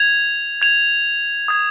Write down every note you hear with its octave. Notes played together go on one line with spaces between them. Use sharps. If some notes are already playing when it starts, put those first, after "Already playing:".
Already playing: G#6 F7
G#6 F7
D#6 G#6 F7